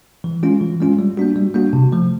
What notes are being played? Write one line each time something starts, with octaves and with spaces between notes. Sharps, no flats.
E3
G#3 C#4 F4
E3
G#3 C#4 F4
G3
A#3 D4 F#4
G3
A#3 D4 F#4
C3
F3 A3